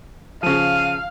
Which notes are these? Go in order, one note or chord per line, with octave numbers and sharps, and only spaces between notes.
C#3 F3 F5 D#7